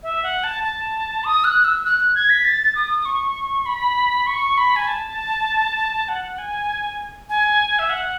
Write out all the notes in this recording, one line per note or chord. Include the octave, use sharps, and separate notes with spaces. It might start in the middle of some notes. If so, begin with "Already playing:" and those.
E5
F#5
A5
A5
D#6
F#6
E6
F#6
F#6
G#6
B6
A6
D#6
C#6
B5
C#6
B5
G#5
A5
F#5
G#5
G#5
E5
F#5